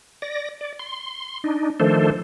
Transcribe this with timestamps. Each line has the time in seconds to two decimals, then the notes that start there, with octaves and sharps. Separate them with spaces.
0.22 D5 A#6
0.61 D5
0.79 C6
1.44 D4 D#4
1.80 D#3 F3 A3 D4 A4 C5